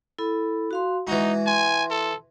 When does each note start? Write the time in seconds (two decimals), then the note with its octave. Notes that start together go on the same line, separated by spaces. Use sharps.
0.19 E4 A4 B5
0.71 F#4 F5 C6
1.07 E3 G#3 D#4 F#4
1.47 G#5 C6
1.91 A4